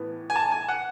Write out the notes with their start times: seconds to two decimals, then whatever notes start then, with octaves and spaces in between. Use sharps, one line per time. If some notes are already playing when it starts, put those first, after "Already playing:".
Already playing: A2 E3 B3
0.30 G#5
0.36 A5
0.51 G#5
0.68 F#5